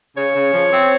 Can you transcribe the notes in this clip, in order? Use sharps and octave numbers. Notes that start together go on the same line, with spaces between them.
C#3 C#5
C#3
F3
C4